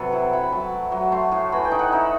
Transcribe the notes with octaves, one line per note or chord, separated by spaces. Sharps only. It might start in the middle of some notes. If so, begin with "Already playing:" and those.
Already playing: C3 F#3 C4 A4 B4 F#5
E4
E4 B5
B5
F#3 A5
A3
F#3
A3 C6
A2
E3 B5
G5
D#4
F#5
D#4 E5